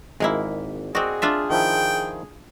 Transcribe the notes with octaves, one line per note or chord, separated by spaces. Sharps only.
G#1 G#3 A#3 E4
C4 F#4 G#4 D5 D#5
D4 F4 E5
D#3 F3 E4 G5